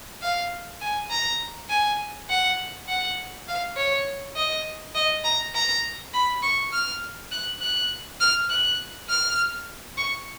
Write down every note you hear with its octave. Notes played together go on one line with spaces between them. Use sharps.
F5
G#5
A#5
G#5
F#5
F#5
F5
C#5
D#5
D#5
A#5
A#5
B5
C#6
F6
F#6
F#6
F6
F#6
F6
C#6